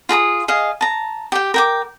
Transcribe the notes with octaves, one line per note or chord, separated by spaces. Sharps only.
F4 G#4 A#5 D#6
G#4 D#5 F5
A5 A#5
G4 G5
A#4 G5 D6